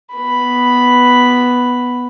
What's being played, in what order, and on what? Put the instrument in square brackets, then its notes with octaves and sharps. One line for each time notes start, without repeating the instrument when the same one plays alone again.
[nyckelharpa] B3 B5